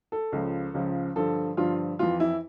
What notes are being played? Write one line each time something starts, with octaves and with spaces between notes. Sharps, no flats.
A4
C#2 C#3 F3
C#2 C#3 F3
G2 D3 F3 A4
G2 D3 F3 F4
F2 E3 F4
E4